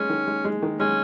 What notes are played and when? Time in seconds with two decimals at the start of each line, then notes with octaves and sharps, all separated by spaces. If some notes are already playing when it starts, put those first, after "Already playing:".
Already playing: G#3 C#4
0.09 D#3
0.27 G#3
0.45 G#3
0.62 D#3
0.80 G#3 C#4